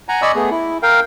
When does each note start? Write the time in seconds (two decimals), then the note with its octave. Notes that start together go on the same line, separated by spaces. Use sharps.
0.09 F#5 G#5 A#5
0.22 D5 D#5 G#5 B5 C#6 E6
0.35 A3 B3 G#4
0.51 E4
0.83 A#4 F5 G5